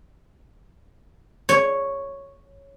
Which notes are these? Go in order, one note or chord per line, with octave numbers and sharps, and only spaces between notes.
C#5